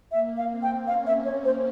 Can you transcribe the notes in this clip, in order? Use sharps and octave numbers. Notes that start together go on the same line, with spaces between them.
A#3 E5
F5
C4
G5
C#4 F5
E5
C#5
C5